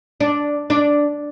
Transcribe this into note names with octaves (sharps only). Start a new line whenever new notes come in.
D4
D4